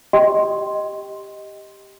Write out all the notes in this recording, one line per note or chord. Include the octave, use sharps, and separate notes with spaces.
G4 D#5 G5 C6